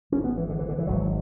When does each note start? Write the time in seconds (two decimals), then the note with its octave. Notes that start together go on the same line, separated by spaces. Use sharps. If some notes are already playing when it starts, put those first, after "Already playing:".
0.12 G#1 C#4
0.15 G#2
0.24 B3
0.37 E3
0.49 D3
0.59 E3
0.69 D3
0.78 E3
0.87 G#1 G#2 F#3